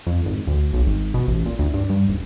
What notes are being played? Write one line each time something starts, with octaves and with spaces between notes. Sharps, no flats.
F2
G#1
D2
B1
G#1
B2
A1
A#2
D2
G2
G2
D#1